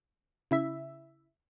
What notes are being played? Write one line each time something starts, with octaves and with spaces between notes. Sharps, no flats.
C#3 E4 E5